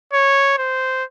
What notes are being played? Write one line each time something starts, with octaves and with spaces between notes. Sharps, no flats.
C#5
C5